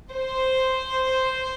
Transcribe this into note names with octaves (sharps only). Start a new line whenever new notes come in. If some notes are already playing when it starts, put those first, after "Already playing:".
C5